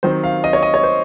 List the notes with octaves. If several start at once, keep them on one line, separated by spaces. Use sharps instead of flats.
D#3 F#3 C4 C5
F5
D#5
C#5
D#5
C#5
C5